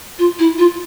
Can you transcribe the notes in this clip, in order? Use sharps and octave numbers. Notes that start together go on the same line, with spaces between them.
F4
E4
F4